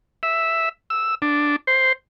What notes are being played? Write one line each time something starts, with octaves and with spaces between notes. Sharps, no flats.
E5
E6
D4
C5